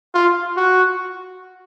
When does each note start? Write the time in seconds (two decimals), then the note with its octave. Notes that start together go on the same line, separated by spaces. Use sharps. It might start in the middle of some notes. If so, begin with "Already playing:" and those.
0.14 F4
0.57 F#4